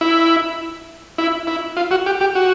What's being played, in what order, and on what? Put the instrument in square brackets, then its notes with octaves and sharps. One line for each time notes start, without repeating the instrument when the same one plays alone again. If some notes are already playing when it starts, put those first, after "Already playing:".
[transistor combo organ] E4
E4
E4
F4
F#4
G4
G4
F#4